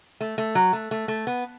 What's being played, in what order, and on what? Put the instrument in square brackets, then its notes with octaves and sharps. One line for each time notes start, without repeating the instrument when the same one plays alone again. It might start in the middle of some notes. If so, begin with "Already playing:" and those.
[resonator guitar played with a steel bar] A3
A3
F#3
A3
A3
A3
B3